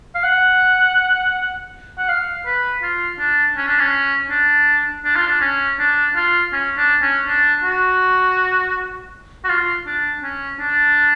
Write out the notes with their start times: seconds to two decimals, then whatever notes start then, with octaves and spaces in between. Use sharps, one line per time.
0.15 F5
0.23 F#5
1.98 F#5
2.08 F5
2.46 B4
2.83 F4
3.19 D4
3.57 C#4
3.68 D4
3.79 C#4
4.30 D4
5.05 D4
5.16 F4
5.27 D4
5.41 C#4
5.79 D4
6.16 F4
6.53 C#4
6.77 D4
7.02 C#4
7.27 D4
7.64 F#4
9.44 F#4
9.49 F4
9.86 D4
10.23 C#4
10.60 D4